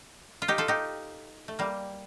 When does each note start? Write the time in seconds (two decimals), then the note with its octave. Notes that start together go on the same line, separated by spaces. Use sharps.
0.42 F4
0.48 D#4 G4
0.58 F4 A4
0.68 D#4 G4
1.48 A3
1.59 G3 A#3